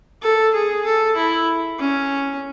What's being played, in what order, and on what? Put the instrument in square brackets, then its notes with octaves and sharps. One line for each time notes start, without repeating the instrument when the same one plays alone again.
[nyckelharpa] A4
G#4
A4
E4
C#4